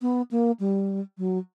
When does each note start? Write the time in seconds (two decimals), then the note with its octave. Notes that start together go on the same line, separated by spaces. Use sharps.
0.02 B3
0.31 A#3
0.60 G3
1.18 F#3